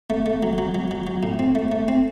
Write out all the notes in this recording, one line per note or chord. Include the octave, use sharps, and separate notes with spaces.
A3
A3
F#3
F#3
F#3
F#3
F#3
A2
C4
A3
A3
C4